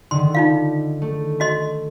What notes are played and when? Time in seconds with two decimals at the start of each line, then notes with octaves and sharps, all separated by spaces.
0.11 D3 D#3 C6
0.34 D#4 F4 F5
1.02 A3
1.40 F#4 D#5 C6